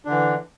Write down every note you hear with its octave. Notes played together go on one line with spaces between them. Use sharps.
D3 E3 D4